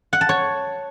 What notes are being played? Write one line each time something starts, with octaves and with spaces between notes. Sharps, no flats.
F#5
A5
C#5